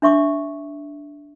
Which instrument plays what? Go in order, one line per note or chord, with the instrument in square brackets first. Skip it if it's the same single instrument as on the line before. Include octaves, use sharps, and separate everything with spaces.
[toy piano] D4 E5 C#6 D6